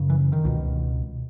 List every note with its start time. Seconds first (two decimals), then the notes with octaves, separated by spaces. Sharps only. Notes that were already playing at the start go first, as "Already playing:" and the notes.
Already playing: F#2 C#3
0.10 E3
0.33 D#3
0.45 C#2 B2